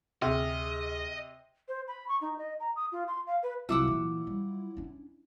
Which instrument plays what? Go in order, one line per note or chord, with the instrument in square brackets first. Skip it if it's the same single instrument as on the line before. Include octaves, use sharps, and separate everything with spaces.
[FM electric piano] D2 G#4 F6 [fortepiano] C3 [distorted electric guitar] D#5
[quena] C5
B5
C#6
D#4
D#5
A#5
D#6
F4
C6
F5
B4
[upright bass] C2 G3 [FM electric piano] F#3 E4 F4 [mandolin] F#5 D6 E6
[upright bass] A#2 E3
G3
C#4 D4